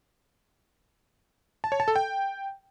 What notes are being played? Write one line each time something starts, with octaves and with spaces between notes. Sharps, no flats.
A5
C#5
A5
A4
G5